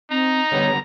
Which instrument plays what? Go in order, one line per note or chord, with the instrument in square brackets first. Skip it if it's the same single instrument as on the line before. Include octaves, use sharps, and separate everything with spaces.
[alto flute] C4 [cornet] D#4 [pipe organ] A#5
[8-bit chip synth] D3 G3 B3 [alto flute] C#5